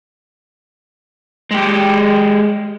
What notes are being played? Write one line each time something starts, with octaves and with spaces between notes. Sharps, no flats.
G#3 G4